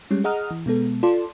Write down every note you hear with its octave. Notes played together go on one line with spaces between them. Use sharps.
G3 G#3 C#4
G#4 D#5 F#5 A#5 D#6 F6
E3
B2 G#3 B3 A4
F4 A4 D5 A5 C6